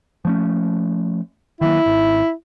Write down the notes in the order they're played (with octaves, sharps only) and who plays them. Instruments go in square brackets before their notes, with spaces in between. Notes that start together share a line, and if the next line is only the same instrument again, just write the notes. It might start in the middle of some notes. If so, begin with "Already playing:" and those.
[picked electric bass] F3 A3 C#4
[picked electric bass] D#3 F#3 A#3 [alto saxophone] E4
[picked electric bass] G#1